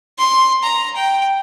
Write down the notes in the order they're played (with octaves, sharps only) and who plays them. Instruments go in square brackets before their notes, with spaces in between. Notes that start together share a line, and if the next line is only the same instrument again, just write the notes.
[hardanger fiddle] C6
A#5
G5